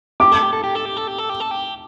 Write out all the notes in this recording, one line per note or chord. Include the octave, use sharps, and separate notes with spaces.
G4 D6
A4
G4
A4
G4
A4
G4
A4
G4
A4
G4
A4
G4